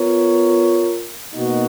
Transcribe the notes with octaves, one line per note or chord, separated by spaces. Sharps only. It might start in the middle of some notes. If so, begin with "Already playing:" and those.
Already playing: B3 F4 A#4 C#5
B2 A#3 D#4 F#4